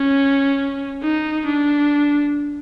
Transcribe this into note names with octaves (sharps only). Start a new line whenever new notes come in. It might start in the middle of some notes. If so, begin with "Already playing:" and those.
Already playing: C#4
D#4
D4